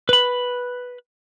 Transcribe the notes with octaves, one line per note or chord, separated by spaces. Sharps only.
B4 B5